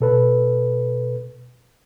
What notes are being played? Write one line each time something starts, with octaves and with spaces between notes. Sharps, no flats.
B2 A4 B4